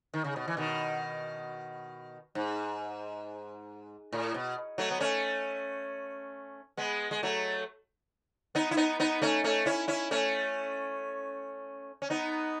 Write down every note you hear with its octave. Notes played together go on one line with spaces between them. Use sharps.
D#3
C#3
B2
E3
B2 D#3
G#2
A2
B2
F#3 A3
B3
A3 C#4
G#3 B3
G#3
F#3 A3
B3 D#4
E4
B3 D#4
B3 D#4
A3 C#4
A3 C#4
C#4 E4
C#4 E4
A3 C#4
C#4
B3 D#4